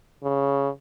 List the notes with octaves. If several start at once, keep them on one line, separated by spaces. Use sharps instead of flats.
C#3